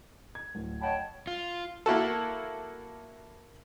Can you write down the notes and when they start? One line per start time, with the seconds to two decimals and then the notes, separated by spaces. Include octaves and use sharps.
0.35 G#6
0.55 D1
0.82 C#5 D#5 F#5 G5 A5 B5
1.27 F4
1.86 A#3 E4 F#4 A4